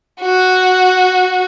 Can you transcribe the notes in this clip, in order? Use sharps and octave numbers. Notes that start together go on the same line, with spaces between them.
F#4